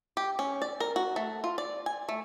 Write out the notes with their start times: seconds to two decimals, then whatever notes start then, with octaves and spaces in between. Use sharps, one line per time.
0.17 G4
0.39 C#4
0.62 D5
0.80 A#4
0.96 F#4
1.16 A3
1.44 F4
1.58 D5
1.86 G#5
2.09 A3